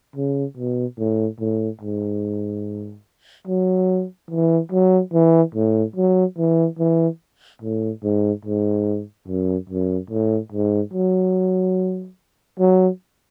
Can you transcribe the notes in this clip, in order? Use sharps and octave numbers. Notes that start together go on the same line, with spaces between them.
C#3
B2
A2
A2
G#2
F#3
E3
F#3
E3
A2
F#3
E3
E3
A2
G#2
G#2
F#2
F#2
A2
G#2
F#3
F#3